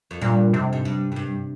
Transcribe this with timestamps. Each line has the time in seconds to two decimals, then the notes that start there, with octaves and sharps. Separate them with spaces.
0.11 F2
0.21 G2 A#2
0.53 F2 C3
0.73 G#2
0.85 G2
1.12 F2
1.16 G2